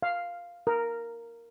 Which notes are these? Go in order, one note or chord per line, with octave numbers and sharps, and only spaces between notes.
F5
A#4